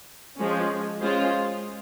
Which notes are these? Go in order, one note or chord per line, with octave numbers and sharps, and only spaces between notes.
F3 G#3 C#4
G#3 C#4 F4 G#4 C5